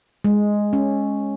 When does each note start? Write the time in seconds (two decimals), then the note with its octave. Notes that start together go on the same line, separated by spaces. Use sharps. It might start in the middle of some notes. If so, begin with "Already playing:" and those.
0.24 G#3
0.73 C#4